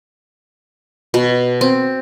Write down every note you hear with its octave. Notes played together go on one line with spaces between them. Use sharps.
B2
C4